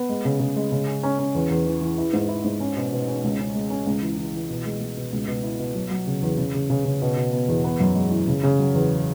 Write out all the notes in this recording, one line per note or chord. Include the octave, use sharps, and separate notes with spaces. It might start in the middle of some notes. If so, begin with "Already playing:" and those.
Already playing: B3
G#3
C#3
C#3
G#3
C#3
C#4
C#4
C#4
E2
E2
E3
E3
E4
G#2
E4
G#2
C#4
B2
B2
C#4
C#2
C#4
G#3
C#4
C#2
E3
E3
E3
B2
G#3
G#3
B2
C#2
B2
E4
B2
F#3
F#3
C#3
E2
C#3
C#3
C#3
C#3
B2
B2
B3
E2
B3
F#2
G#3
E3
C#3
C#3
F#3
E2